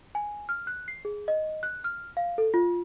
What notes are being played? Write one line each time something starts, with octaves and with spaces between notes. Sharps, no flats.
G#5
F6
F#6
C7
G#4
D#5
F#6
F6
F5
A4
F4